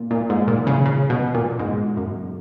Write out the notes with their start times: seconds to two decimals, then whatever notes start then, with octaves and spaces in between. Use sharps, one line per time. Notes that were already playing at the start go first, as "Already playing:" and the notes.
Already playing: A#2
0.11 A#2
0.30 G#2
0.48 A#2
0.67 C#3
0.86 C#3
1.10 B2
1.34 A#2
1.59 G#2
1.97 F#2